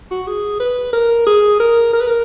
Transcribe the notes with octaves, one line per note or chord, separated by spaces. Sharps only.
F#4
G#4
B4
A#4
G#4
A#4
A#4
B4
A#4